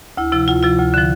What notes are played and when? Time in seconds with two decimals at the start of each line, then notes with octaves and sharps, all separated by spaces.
0.17 D2 E4
0.32 C3 F3 E4
0.48 D2 F4
0.63 C3 F3 F4
0.78 D2
0.94 D3 F3